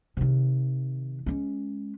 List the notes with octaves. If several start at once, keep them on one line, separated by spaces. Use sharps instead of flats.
C3 D#3
G#3 C#4